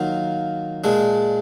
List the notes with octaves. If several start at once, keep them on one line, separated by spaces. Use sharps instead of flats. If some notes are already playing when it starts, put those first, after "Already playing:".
Already playing: D#3 F#3 A#3 F4
A#2 G#3 D4